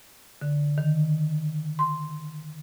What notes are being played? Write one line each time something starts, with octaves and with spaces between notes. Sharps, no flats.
D3
D#3
C6